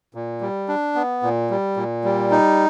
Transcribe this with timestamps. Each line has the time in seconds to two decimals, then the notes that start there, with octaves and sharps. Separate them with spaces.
0.14 A#2
0.41 G3
0.68 D4
0.95 B3
1.23 A#2
1.50 G3
1.77 A#2
2.04 G3
2.31 D#4